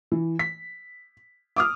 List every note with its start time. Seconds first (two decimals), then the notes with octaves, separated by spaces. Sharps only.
0.12 E3
0.39 B6
1.56 D6 D#6 F6